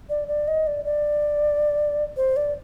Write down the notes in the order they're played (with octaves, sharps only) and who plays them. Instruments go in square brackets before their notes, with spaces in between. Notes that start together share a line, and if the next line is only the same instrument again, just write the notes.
[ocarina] D5
D5
D#5
D5
D5
C5
D5